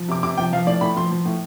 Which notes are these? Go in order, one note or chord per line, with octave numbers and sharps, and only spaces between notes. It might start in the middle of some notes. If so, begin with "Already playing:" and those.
Already playing: F3
C3 D6
C3 D6
F3 G5
F3 F5
A2 D5
A2 B5
F3 C6
F3
A2